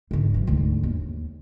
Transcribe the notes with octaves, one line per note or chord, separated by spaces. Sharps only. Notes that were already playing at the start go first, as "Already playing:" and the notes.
G#2 D3
E3 F#3
D2 G#2
D#2